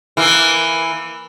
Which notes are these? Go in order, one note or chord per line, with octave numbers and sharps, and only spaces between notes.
E3 A#3